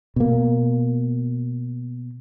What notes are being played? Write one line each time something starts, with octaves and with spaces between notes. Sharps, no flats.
B2 A#3